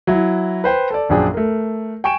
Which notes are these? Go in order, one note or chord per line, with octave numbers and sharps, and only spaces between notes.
F#3 E4
B4 C5 G5
A4 D5
A#1 F#2 D4 G#4 G5
A3 A#4
G5 G#5 C#6 D7 E7